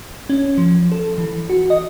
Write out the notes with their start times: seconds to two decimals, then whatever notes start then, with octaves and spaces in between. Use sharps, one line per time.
0.30 C#4
0.58 F3
0.92 A4
1.18 E3
1.50 F#4
1.70 D#5